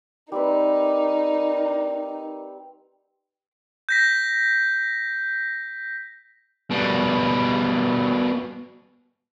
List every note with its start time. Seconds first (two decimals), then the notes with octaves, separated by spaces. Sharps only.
0.32 G3 C4 D#4 A#4 B4 D5
3.89 G6 A#6 B6
6.71 B2 G3